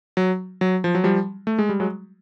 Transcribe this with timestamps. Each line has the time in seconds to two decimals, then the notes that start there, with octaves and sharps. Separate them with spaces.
0.17 F#3
0.61 F#3
0.84 F3
0.95 F#3
1.04 F3 G3
1.47 A3
1.59 G#3
1.69 G3
1.80 F#3 G#3